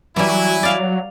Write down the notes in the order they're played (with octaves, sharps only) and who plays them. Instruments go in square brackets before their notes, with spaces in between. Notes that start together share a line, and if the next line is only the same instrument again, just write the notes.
[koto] E3 G3 [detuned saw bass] F#3 [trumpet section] E4 G#5
[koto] D5 F5